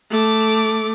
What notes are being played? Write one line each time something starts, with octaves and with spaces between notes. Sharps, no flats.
A3 D6